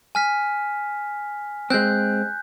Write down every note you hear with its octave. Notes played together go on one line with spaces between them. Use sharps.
G#5 F6 B6
G#3 C4 F#6 G6